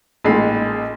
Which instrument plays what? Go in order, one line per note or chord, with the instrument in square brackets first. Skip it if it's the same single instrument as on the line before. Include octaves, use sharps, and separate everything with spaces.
[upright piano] A1 A#2 G#3 D#4 B5 C7